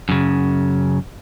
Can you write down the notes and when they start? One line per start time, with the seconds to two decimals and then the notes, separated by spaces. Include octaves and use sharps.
0.09 F#2 C#3